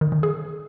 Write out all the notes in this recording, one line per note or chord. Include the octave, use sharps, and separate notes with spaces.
D#3
D#3
G#4